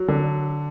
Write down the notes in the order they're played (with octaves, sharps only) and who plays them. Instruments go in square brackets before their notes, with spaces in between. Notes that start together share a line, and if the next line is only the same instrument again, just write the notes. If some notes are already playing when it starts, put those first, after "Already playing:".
Already playing: [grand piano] F#3
D3